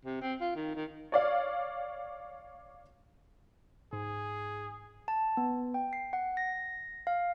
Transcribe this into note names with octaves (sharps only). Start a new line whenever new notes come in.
C3
C4
F4
D#3
D#3
C#5 D5 F5
G#2 G#4
A5
B3
G5
C7
F#5
A#6
F5